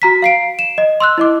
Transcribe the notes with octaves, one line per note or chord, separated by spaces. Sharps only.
F#4 A#5 B6
F5 C7 D7
E7
D#5
C6 E6 F#6
E4 D#5 D6